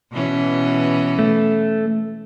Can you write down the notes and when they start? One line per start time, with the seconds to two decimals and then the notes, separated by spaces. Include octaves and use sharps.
0.12 B2 E3 C#4
1.19 A3